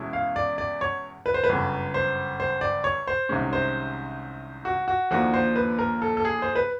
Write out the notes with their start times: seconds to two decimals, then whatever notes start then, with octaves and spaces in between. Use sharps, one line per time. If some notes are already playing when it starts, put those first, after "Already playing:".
Already playing: E2 B2 G#3 C#4 E4
0.13 F5
0.36 D5
0.58 D5
0.81 C#5
1.26 B4
1.34 C5
1.44 B4
1.49 G1 F#2 C#3
1.94 C5
2.40 C5
2.61 D5
2.84 C#5
3.07 C5
3.29 C2 C3 D#3 G#3 C#4
3.53 C5
4.65 F#4
4.88 F#4
5.11 D#2 D3 F3 A#3 D4 F#4
5.34 C5
5.56 B4
5.79 A#4
6.02 A4
6.17 A4
6.25 G#4
6.42 C5
6.56 B4